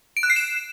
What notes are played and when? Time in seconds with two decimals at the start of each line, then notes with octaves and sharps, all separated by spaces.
0.17 D7
0.23 F#6
0.30 C7
0.36 E7